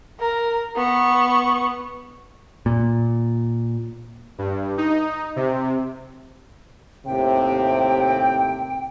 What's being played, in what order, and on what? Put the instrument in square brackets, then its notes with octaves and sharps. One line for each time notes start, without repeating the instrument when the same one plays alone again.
[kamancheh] A#4
B3 C#6
[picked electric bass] A#2
[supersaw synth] G2
D#4
C3
[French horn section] D#2 A2 C3 [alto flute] G5